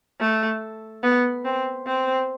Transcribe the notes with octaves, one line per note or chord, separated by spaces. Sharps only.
A3
B3
C4
C4